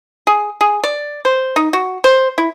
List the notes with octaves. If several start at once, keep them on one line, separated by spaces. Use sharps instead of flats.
G#4
G#4
D5
C5
D#4
F#4
C5
E4